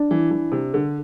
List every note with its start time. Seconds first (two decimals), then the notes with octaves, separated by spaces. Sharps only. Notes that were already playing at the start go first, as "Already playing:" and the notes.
Already playing: D4
0.11 E3
0.31 E3
0.52 C3
0.74 D3